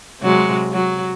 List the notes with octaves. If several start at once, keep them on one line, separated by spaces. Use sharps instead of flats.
C3 F#3 G#3
F#3